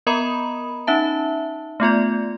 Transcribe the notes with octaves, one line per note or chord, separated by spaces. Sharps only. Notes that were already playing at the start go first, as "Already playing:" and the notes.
B3 A#4 D#5 A#5 B5 D#6
C#4 D#4 E5 A5
A3 B3 F4 D5